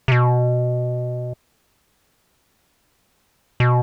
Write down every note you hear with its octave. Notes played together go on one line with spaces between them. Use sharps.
C3
B2
B2